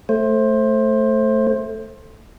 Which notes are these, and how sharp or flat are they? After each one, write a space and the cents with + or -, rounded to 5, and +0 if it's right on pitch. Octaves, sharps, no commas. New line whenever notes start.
A3 +0 C5 +20